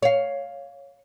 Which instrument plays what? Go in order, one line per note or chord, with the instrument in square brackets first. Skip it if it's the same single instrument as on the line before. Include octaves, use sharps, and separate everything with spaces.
[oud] C#5 F5